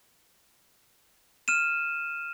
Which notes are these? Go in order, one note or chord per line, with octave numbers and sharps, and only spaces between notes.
F6 D#7 E7